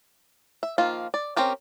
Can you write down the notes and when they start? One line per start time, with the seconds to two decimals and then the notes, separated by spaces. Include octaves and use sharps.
0.63 E5
0.78 D#3 F3 A#3 F4
1.14 D5
1.36 C4 C#4 G4 A#4